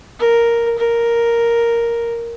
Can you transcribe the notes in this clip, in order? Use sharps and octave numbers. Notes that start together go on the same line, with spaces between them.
A#4
A#4